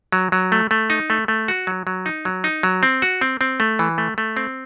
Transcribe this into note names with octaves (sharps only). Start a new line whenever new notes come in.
F#3
F#3
A3
A3
D#4
A3
A3
F#4
F#3
F#3
D#4
F#3
D#4
F#3
C4
F#4
C4
C4
A3
E3
A3
A3
C4